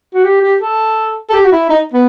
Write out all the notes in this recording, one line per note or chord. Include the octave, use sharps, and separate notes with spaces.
F#4
G4
G4
A4
A4
G4
F#4
E4
D#4
B3